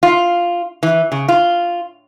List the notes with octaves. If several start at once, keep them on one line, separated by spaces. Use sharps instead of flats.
F4
E3
C#3
F4